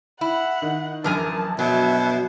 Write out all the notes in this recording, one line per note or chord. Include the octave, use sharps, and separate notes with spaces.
E4 F#5
D#3
A#1 F#2 D3 E3 A#4 G#5 A5
B2 F#3 E5